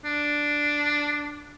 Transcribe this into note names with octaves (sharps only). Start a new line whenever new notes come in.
D4